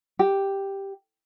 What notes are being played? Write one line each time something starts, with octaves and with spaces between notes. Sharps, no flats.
G4